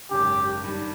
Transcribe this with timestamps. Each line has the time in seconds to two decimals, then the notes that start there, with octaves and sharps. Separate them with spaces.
0.11 G#1 F#2 C#3 G4
0.64 G2 D#3 G3